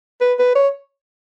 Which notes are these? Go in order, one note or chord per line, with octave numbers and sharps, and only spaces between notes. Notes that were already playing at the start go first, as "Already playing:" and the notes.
B4
B4
C#5